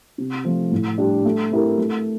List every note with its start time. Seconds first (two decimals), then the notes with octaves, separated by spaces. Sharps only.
0.18 C3
0.45 F3 A3
0.72 A2
0.98 G3 D4
1.25 A3
1.51 C4 E4 G4 A#4
1.78 A3